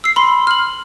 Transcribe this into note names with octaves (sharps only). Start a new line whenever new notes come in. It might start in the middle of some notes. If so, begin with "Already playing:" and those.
E6 C7
B5 C6
F6 F#7